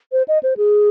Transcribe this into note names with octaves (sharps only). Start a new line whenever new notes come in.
C5
D#5
C5
G#4